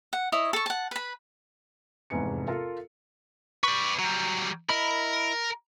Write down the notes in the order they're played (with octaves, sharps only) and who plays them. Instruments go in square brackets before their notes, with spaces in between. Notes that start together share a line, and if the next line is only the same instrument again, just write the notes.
[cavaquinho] F#5
E4 C#5 D#5
A4 C#6
F#5 A5
B4 B5
[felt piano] F1 E2 G#2 B4 G#5 C#7
F4 A4 A#4
[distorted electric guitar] B4 D5 [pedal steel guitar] C#6
[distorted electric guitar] F#3 G3 [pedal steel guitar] A#5
[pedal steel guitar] E4 D#5 B5 [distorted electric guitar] A#4